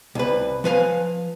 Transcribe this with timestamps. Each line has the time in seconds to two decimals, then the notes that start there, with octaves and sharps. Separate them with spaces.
0.15 C2 B4
0.64 F3 B4 F5 G#5